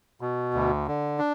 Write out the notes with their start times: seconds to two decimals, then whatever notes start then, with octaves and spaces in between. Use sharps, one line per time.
0.21 B2
0.54 D2
0.87 D3
1.19 D4